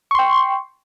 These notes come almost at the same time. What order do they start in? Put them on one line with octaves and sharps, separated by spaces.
C#6 C6 G5